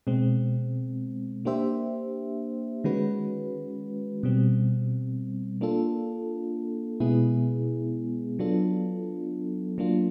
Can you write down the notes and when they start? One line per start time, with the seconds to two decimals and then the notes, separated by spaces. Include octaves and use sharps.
0.07 B2 G#3 C4
1.45 A#3 D4 G4 C5 E5
2.84 D#3 G#3 C#4 F#4 B4
4.23 B2 G3 C4
5.61 A#3 D4 F4 A4
7.00 B2 G#3 B3 E4 G#4
8.39 F#3 B3 D4 F4 A4
9.78 F#3 A#3 D4 F4